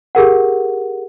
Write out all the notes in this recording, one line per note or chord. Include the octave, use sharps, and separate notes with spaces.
G4 G#4 A#4 F#5